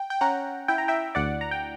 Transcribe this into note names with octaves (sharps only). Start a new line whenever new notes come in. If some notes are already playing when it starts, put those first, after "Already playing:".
Already playing: G5
G5
C#4 F#5 A#5
E4 G5
A#5
E5 G5
D2 D5 F#5
A#5
G5